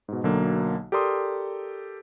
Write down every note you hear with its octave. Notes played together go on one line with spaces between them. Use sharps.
G#2 B2
B1 D3 F#3 A#3
G4 A4 A#4 D5 C6 D#6